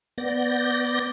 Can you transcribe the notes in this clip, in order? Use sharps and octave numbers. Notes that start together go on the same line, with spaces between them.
B3 D5 G6 A#6